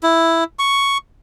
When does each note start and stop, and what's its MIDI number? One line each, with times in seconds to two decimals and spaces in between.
0.03 0.44 64
0.59 0.98 85